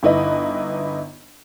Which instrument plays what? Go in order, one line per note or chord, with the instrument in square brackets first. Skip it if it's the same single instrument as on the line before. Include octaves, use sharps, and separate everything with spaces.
[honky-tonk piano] G1 D#4 E4 B4 D#5 B5